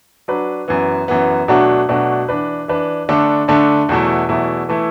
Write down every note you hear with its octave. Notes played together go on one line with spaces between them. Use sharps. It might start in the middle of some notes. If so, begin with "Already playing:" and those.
F#3 D4 B4
F#2 E3 B3
F#2 E3 B3
B2 F#3 A3 D4 F#4
B2 F#3 A3 D4 F#4
E3 D4 B4
E3 D4 B4
D3 A3 D4 A4
D3 A3 D4 A4
E2 B2 F#3 A3 E4
E2 B2 F#3 A3 E4
E3 A3 E4